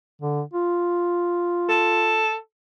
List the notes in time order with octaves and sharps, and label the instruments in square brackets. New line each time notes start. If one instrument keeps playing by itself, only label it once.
[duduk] D3
F4
[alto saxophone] A4